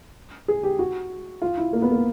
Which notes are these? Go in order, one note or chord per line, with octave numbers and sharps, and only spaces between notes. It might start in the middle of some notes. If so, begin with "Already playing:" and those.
G#4
G4
F#4
F4
E4
A#3
B3
A#3